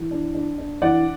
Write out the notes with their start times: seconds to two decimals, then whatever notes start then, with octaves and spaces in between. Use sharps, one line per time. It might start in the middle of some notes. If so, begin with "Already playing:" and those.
Already playing: E3
0.11 D4
0.35 D4
0.58 D4
0.82 E3 D5 F#5